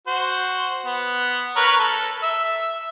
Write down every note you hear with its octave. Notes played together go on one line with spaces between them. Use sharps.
F#4 C5
B3
A#4 B4 C#5
A4
E5